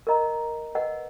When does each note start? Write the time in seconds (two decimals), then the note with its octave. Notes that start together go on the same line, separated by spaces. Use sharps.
0.07 A#4 D#5 A#5
0.75 B4 D#5 F#5